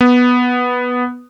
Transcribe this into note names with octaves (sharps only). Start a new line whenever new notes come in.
B3